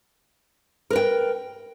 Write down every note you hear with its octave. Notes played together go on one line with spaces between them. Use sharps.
A#4 B4 G5